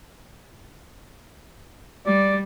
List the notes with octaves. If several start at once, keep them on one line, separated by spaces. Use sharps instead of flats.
G3 D5